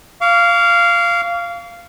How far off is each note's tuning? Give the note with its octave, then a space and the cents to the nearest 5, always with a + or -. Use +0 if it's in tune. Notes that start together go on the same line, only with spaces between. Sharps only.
F5 -10 C#6 +45